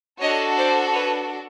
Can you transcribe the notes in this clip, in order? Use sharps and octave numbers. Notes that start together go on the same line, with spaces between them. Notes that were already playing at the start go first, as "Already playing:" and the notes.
D4 F#4 A4 C#5 D#5
C5 D5
B4 C#5